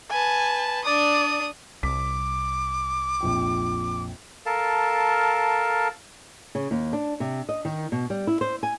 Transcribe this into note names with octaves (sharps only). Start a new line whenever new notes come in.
B4 G#5 A5
D4 D5 D#6
C2 D6 B6
A#1 F2 G5
A4 A#4 F5 A5
C#3
D#2
D4
C3
D#5
D#3
B2
G3
E4
C5
G#5